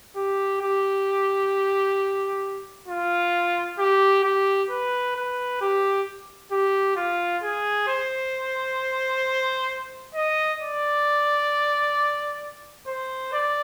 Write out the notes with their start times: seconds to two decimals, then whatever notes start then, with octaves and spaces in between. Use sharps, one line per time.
0.16 G4
0.61 G4
2.88 F4
3.79 G4
4.24 G4
4.70 B4
5.16 B4
5.61 G4
6.52 G4
6.96 F4
7.43 G#4
7.88 C5
10.14 D#5
10.61 D5
12.87 C5
13.33 D5